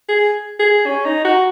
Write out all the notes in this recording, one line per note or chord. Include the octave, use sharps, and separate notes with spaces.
G#4
G#4
C#4
D#4
F#4